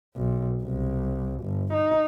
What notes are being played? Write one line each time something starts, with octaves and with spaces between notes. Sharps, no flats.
B1
C2
G1
D#4